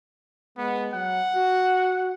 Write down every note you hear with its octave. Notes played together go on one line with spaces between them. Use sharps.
G#3 B3
F#3 F#5
F#4